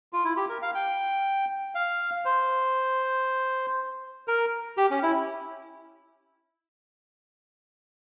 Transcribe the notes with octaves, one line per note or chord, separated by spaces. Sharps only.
F4
E4
G4
A#4
F5
G5
F5
C5
A#4
G4
C#4
E4